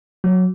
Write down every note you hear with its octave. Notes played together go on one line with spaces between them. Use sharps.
F#3